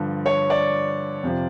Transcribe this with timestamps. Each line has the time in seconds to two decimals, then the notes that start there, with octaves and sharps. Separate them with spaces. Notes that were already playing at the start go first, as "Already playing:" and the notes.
Already playing: G2 D3 F3
0.26 C#5
0.50 D5
1.23 F2 C3 F3